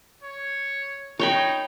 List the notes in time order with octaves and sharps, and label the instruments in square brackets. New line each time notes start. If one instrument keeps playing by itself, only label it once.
[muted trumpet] C#5
[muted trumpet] D#4 [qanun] C#5 G5 B5